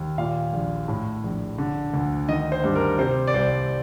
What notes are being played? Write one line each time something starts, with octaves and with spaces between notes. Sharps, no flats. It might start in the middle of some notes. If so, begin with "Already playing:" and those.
Already playing: D#2
A#2 F5
A#1
A2
A#1
D3
D2
D#3 D#5
C5
G2
A#4
C3 C5
D5
C2 C5